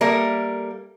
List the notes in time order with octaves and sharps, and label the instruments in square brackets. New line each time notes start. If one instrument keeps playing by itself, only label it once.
[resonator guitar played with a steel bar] G3 A#3 A4 A#4 E5